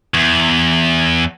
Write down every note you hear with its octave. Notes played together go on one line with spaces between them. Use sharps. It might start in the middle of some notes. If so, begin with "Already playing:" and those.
E2